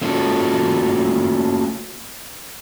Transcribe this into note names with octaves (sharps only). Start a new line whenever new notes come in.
A3 A#3 C#4 F4 F#4 A4